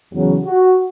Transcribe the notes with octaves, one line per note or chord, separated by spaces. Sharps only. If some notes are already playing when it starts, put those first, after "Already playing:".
E2 C#3 F#3
F#4